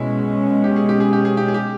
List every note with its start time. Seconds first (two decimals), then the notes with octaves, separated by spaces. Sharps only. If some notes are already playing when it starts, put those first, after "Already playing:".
Already playing: B2 G#3 C#4 E4
0.64 G4
0.76 G#4
0.89 G4
1.00 G#4
1.13 G4
1.25 G#4
1.37 G4
1.48 G#4
1.54 G4